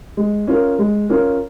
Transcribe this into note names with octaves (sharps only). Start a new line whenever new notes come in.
G#3
C#4 F4 A#4
G#3
C#4 F4 A#4